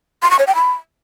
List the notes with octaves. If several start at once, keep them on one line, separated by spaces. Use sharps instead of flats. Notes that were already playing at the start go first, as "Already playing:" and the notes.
C6
C#6
C#5
G5
B5